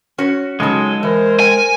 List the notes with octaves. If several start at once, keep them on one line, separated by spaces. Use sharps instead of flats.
C#4 F#4 C#5
C#3 F#3 G#3 D#4 A4
E3 A#4 C5
G5 G#5